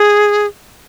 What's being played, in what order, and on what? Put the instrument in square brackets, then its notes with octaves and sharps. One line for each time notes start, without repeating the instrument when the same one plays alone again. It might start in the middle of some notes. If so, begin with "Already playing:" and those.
Already playing: [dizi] G#4